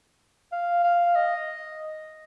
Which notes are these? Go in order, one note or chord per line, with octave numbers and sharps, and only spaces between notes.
F5
F5
D#5